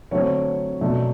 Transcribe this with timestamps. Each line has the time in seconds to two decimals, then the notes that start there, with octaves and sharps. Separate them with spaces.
0.11 D3 F#3 A3 C4 C#5
0.81 B2 F#3 A3 D4